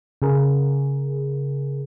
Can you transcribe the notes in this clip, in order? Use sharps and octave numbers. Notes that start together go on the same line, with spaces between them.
C#3 G#4 A#4